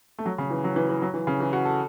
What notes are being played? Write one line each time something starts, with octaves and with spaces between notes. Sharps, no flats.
A3
F#3
C#3
E3
F#3
E3
E3
F#3
E3
C#3
E3
F#4
A4